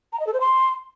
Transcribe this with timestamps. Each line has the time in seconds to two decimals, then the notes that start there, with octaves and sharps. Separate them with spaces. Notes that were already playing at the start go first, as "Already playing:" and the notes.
0.13 A#5
0.20 D#5
0.27 A4
0.34 C5
0.40 C6